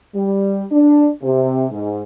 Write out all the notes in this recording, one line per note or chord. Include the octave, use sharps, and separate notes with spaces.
G3
D4
C3
G#2